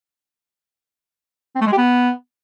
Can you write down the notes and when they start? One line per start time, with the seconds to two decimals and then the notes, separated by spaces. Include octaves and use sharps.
1.56 C4
1.61 A3
1.67 G#3
1.72 G4
1.78 B3